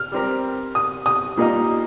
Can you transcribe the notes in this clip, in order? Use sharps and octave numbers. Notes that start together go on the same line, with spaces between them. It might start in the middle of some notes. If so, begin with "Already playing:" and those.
Already playing: F6
G3 C4 G4 A#4
D#6
D#6
A#2 G3 A#3 D#4 A#4